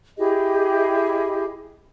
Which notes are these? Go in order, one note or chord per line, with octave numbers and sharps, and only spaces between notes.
E4 G4 G#4 D#5